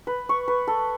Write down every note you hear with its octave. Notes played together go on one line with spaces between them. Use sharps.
B4
C#6
B4
A4